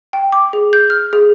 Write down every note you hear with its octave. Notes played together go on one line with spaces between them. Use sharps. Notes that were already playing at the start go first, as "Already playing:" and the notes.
G5
D6
G#4
G6
F6
G#4